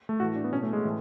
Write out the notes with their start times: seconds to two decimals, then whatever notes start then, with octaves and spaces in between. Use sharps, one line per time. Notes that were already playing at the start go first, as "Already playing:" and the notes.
0.09 A3
0.20 A2 F#4
0.23 E3
0.36 D4
0.44 B3
0.52 B2 C#4
0.63 A3
0.73 G#3
0.84 A2 E3